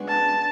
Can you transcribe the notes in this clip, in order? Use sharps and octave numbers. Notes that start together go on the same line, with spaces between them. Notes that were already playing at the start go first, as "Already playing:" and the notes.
Already playing: C#3 G#3 B3 D4 F#4
A5